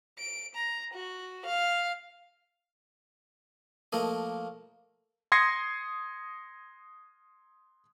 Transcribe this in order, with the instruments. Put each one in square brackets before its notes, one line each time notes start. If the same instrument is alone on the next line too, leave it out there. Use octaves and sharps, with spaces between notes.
[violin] D7
A#5
F#4
F5
[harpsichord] F3 A3 A#3 D#5
[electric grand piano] C6 D#6 G#6 A#6 C7 C#7